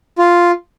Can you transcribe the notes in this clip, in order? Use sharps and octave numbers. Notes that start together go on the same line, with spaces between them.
F4